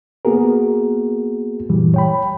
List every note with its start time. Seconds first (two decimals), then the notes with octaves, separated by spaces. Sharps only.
0.25 A#3 B3 F#4 G#4 A#4
1.69 F#2 A#2 E3 G3
1.94 C#5 G5 B5